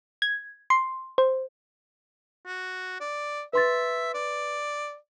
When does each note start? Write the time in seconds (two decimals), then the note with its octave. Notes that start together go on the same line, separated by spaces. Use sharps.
0.22 G#6
0.70 C6
1.18 C5
2.46 F#4
3.00 D5
3.53 B4 E5 C6 A6
4.14 D5